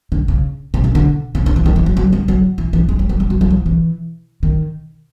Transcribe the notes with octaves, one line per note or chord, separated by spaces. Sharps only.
D3
C#3
C3
C#3
D3
C#3
D3
E3
D#3
E3
F#3
F#3
G3
F#3
E3
E3
G#3
G3
F#3
G3
F#3
F#3
F3
E3
D#3